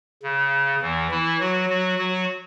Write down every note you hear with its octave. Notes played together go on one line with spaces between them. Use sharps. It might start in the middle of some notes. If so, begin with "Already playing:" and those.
C#3
E2 E3
E3 E4
F#3 F#4
F#3 F#4
F#3 F#4